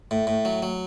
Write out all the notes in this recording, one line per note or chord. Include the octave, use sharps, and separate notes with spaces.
A2
A2
F#3
F#3